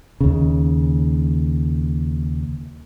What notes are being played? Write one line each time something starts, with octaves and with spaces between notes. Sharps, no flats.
D#2 C#3